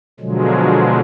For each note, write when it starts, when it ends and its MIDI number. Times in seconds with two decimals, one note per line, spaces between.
0.20 1.00 47
0.20 1.00 50
0.20 1.00 53
0.20 1.00 54
0.20 1.00 56